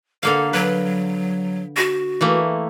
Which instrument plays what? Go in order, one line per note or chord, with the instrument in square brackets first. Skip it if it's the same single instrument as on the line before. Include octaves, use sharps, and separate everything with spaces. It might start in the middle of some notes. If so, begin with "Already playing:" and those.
[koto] D3 A#3 F5 [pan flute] A4
[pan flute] F#3 [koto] B4
[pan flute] F#4
[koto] E3 A3 A#3